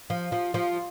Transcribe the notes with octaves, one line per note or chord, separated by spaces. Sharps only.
F3
F3
F3